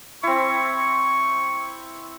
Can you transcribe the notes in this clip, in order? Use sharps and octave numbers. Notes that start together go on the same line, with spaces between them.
C4 E4 C#6